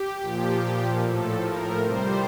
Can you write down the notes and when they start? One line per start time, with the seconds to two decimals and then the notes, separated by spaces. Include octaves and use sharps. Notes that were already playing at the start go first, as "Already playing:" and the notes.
Already playing: G4
0.20 A#2 F3
1.02 A2 F3 A4
1.43 A#4
1.83 C3 G3 C5